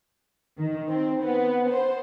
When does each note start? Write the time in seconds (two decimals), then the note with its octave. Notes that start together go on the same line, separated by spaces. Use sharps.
0.58 D#3
0.89 C4
1.23 B3
1.69 C5